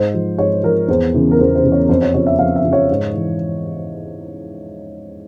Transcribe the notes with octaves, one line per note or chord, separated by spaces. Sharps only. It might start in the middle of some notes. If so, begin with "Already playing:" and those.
Already playing: G#2 C5
F3
G#2 C#5
F3 A#4
E2 C5
C#3 E3
A#4
E2 C5
C5
C#3 E3
C#5
F2 C5
C#5
C#3 F3 C#5
E5
F2 F5
E5
C#3 F3
C#5
G#2
E3